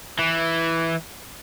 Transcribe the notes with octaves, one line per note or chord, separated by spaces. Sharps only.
E3